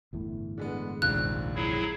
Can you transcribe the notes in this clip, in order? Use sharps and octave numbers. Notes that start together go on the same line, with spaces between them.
G1 E2 A2
D3 G#3 B3
F1 A#1 D#2 G#2 F#6
F#3 E4 G#4